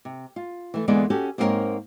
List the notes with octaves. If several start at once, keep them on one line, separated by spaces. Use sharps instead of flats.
C3
F4
E3 A3
E2 D3 G#3 A#3 B3 D5
C#4 F#4 G4 A4
G#2 A#3 C4 D#4 A#4 C#5